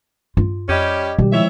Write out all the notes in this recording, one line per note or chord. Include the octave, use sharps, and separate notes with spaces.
G2 F4
F2 G3 C#4 G4 D#5 D6 G#6
B2 D#3 G3 G4
F3 G#3 C4 E4 C#5 E5